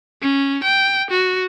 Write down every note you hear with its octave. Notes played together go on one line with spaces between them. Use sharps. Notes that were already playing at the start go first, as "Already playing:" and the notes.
C#4
G5
F#4